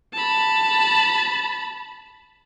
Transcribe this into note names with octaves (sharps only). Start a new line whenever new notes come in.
A5 B5